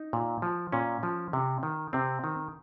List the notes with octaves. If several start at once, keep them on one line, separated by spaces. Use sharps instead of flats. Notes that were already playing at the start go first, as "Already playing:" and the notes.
Already playing: D#4
A#2
F3
A#2 C#4
F3
C3
D#3
C3 C4
D#3